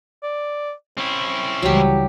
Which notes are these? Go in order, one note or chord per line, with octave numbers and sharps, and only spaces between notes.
D5
C4 C#4 E4
C#2 E3 F#3 G3 G4